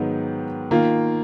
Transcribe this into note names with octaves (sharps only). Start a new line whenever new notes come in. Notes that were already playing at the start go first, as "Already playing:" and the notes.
Already playing: G#2 D#3 F#3 B3
D#3 A#3 F4